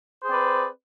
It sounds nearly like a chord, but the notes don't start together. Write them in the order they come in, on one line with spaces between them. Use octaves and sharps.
C5 G#4 C4 D5 B4